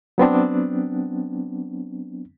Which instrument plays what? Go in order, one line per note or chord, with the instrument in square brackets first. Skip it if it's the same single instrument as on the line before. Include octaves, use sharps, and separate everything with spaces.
[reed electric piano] F#3 B3 C4 D4